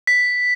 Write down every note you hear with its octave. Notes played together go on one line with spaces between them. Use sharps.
B6